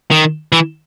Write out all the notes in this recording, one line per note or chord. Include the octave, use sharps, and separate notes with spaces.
D#3
E3